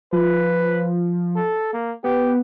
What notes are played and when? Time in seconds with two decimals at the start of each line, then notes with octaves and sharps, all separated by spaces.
0.13 F3 B4
1.36 A4
1.73 A#3
2.04 B3 G4